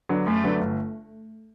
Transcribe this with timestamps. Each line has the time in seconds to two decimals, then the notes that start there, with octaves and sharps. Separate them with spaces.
0.09 D3 F#3 B3 D4
0.26 F#2 A3
0.44 D3 F#3 B3 D4
0.61 G1